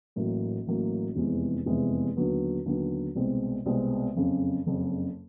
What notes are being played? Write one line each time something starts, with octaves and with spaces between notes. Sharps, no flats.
A1 A2 F#3 A#3
A1 A2 F#3 A#3
F1 E2 C3 E3 G#3
F1 E2 C3 E3 G#3
D#2 D3 F#3 B3
D#2 D3 F#3 B3
C2 B2 G#3 C4
C2 B2 G#3 C4
F#1 F2 C#3
F#1 F2 C#3